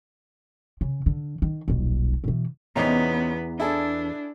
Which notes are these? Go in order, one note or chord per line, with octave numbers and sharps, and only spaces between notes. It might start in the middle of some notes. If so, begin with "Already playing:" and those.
C#3
D3
D#3
D#1 B1
B2 E3
E2 C3 E3 B3 C#4 D#4 A#5
D4 E4 G#4 A4